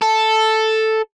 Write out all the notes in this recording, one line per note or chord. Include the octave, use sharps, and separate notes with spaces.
A4